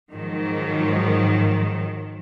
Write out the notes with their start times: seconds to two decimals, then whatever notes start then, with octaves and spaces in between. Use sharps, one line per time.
0.11 G#2 D#3 F3 F#3